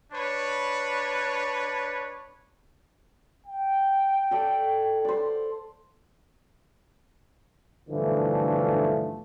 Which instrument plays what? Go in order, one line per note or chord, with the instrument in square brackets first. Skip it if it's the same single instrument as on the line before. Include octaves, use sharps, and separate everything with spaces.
[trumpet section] D4 B4 C#5
[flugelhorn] G5
[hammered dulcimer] A4 D5
C5 D5
[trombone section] B1 G2 D3 E3 F3 A3